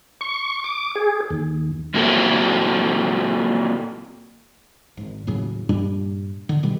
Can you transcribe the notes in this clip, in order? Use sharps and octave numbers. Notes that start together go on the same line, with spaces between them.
C#6
D6
G#4
D#2
A#2 F#3 A#3 C4 E4 A4
G#1
D#2 A2 C#3 F#3
G2 A#2 G3 D4
D3
B2 D#3 G3